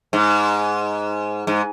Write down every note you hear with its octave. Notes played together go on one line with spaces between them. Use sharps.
G#2
G#2